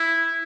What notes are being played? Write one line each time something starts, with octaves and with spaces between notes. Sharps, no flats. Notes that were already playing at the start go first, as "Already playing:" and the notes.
Already playing: E4